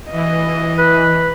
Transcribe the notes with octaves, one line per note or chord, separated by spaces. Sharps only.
E3 D#5
B4